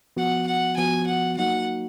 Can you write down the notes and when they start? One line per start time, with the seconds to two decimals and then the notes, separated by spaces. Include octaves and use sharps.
0.17 F3 B3 F#4 F#5
0.47 F#5
0.77 F3 B3 F#4 G#5
1.06 F#5
1.37 F#3 A#3 D#4 F#4 F#5